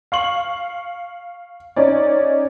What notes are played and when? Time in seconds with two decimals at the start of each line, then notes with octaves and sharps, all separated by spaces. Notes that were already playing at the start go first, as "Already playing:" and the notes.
0.12 F5 C#6 F#7
1.76 C#4 D#4 D5